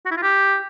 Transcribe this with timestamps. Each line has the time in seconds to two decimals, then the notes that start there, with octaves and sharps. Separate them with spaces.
0.06 F#4
0.11 E4
0.17 F4
0.22 G4